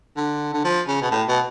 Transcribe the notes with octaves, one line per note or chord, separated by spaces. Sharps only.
D3
D3
F3
C#3
B2
A2
B2